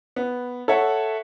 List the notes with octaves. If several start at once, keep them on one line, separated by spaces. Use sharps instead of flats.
B3
A4 C#5 E5 F#5